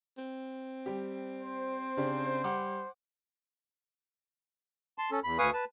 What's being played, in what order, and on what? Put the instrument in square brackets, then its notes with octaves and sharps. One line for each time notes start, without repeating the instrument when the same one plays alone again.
[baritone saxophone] C4
[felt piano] G3 G4
[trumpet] C5
[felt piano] C#3 D4 G4
[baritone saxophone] G3 [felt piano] F#5 D6
[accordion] A5 C6
C#4 A4
E2 B5
D2 B4 F5 G#5 C#6 D#6
B4 A5